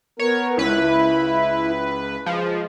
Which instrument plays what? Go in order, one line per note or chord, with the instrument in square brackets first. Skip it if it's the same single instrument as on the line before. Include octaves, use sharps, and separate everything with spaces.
[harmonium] B3 A#4 [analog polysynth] C#5
[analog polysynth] C#2 B4 [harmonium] E4
[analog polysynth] F3 [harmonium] G#3